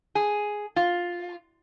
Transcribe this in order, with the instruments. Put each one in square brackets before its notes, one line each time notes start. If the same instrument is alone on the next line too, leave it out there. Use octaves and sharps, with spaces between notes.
[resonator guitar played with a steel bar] G#4
F4